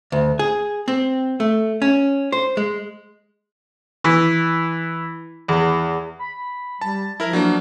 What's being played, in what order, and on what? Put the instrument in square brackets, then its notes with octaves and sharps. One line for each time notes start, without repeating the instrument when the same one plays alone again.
[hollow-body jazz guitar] D2
G#4
C4
A3
C#4
C5
G#3
[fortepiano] E3
E2
[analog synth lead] B5
[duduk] G3 [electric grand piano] A5
[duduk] F3 [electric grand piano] E4 A#4
[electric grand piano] F#3 A#3 [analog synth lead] D4